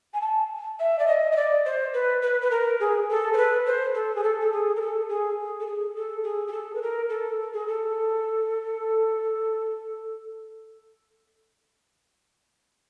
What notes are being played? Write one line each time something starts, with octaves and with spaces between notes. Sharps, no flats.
G#5
A5
E5
D5
D#5
D#5
D5
C5
B4
B4
B4
A#4
G#4
A4
C5
B4
C5
A4
G#4
A4
A4
G#4
A#4
A4
G#4
A4
G#4
A4
G#4
G#4
A4
B4
A#4
A4
G#4
A4